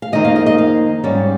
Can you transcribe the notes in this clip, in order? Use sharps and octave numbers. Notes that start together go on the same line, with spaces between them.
F5
F2 D#3 A#3 D#4 D#5
F5
D#5
D#5
F5
G#2 G3 C#4